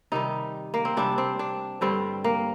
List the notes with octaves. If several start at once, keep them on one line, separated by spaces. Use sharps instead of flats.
C3 D#3 G3 D#4
A#3
C4
C3 G3 D4
C4
D4
G2 D3 G3 C4
A#3